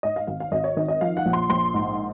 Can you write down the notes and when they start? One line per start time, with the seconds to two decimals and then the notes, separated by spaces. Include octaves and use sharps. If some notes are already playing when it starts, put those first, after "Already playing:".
0.03 G#2 D#5
0.16 F5
0.27 G#1 F5
0.40 F5
0.52 G#1 D#5
0.64 C#5
0.76 D#3 D#5
0.88 D#5
1.01 F3 F5
1.17 F#5
1.25 A#1
1.33 C6
1.49 A#1 C6
1.74 G#2